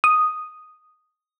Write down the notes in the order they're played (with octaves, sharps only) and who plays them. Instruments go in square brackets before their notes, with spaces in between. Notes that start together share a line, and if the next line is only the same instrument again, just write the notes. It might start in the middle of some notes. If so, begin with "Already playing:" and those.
[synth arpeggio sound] D#6